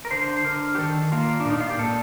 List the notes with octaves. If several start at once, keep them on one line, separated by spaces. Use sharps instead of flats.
A#4
D3 C5
D3 A#4
G4
D#3 A4
A#3 F4
D4
A#2 D#4
F4
G4
A#2 A4